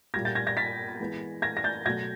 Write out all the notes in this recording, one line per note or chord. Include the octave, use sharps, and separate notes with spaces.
A#2 G3 A#3 G#6 A#6
G6 A6
G#6 A#6
G#6 A#6
A6 B6
E3 G#3 B3
G#6 A#6
A#6
G6 A6
B2 F#3 A3 G#6 A#6